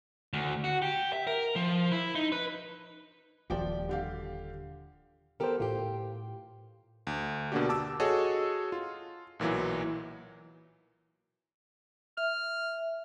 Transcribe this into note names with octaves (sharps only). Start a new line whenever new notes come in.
D2
F#4
G4
E5
A#4
F3
E4
D#4
B4
D#1 A#2 F3 G4 D5 G5
D3 G4 F5
B3 G4 A4 A#4 C5
A2 F4 G4
D2
B2 D3 A#3 D4 F#4 G4
A5 D6 E6
F#4 G#4 A4 C#5 D#5
F4
B1 A#2 E3 F#3
E5 F6